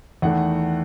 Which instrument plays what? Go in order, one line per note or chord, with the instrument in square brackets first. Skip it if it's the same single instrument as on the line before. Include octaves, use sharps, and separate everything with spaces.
[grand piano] E2 D#3 A3 F#5